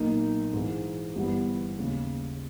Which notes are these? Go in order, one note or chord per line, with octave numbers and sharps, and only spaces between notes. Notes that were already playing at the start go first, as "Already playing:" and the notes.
Already playing: B1 A#2 A#3 D#4
G#2 E3 G#3
G1 G2 E3 G3 B3
D#2 C#3 G#3